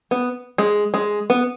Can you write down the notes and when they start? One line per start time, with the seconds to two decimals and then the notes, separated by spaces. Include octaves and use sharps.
0.11 B3
0.58 G#3
0.94 G#3
1.30 B3